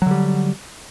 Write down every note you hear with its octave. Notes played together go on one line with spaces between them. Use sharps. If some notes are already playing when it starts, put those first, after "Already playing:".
D3 F#3 G3